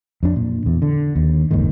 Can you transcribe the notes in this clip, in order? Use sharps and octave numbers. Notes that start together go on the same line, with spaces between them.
F2 D4
A#2
E2
D3
D#2
F#1 D#2 G#2 D#3